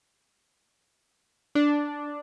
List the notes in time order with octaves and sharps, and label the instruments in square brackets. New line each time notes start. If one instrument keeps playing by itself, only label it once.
[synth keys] D4